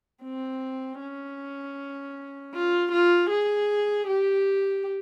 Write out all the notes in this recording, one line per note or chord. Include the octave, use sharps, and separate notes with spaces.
C4
C#4
F4
F4
G#4
G4